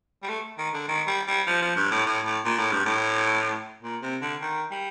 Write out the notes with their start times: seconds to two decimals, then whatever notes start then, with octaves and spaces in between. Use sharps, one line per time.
0.23 G3
0.29 A3
0.58 D#3
0.74 D3
0.88 D#3
1.07 G3
1.28 G3
1.47 F3
1.62 F3
1.76 G2
1.91 A2
2.06 A2
2.25 A2
2.45 A#2
2.59 A2
2.72 G2
2.85 A2
3.83 A#2
4.02 C3
4.22 D3
4.42 D#3
4.71 G3